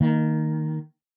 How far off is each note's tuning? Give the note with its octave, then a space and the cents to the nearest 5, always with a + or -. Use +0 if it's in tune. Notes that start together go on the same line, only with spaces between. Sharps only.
D#3 +0 A#3 -25